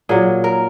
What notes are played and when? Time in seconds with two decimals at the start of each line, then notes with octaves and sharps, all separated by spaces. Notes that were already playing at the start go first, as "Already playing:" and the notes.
0.09 A#2 F#3 G#4
0.44 A#4